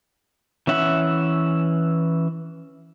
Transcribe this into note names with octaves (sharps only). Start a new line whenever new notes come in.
E3 C#4 E5 F#5